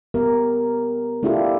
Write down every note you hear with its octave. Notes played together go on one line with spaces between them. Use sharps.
B3 G4 A#4
A3 D4 E4 F4 G4 A4